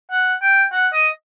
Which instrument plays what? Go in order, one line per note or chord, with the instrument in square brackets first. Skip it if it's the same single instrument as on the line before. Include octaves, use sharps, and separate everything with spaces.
[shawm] F#5
G5
F#5
D#5